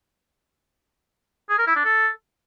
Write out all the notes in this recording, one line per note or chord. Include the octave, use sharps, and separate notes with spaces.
G#4
A#4
E4
D4
A4